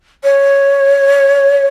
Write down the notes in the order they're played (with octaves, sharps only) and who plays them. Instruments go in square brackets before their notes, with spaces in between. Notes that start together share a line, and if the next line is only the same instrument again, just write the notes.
[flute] C#5